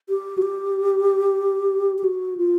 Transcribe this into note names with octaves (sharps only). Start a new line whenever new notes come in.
G4
F#4
G4
G4
F#4
F4